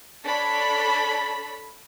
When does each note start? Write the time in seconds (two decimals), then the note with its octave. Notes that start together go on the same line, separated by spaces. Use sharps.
0.24 D4 A4 C#5 A5 B5